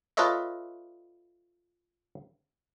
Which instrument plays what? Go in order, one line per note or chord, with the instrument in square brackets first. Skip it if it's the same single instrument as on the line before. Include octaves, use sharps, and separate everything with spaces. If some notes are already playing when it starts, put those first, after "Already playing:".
[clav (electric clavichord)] F4 A4 B4 C#5 D#5 E5